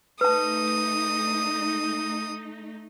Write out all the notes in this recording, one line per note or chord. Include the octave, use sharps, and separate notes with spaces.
A3 D#4 B4 A5 D#6